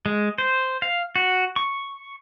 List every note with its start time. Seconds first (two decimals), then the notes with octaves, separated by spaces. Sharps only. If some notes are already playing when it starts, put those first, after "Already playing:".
0.06 G#3
0.38 C5
0.82 F5
1.16 F#4
1.56 C#6